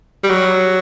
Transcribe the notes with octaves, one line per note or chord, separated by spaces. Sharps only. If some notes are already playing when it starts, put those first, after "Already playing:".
G3
F#3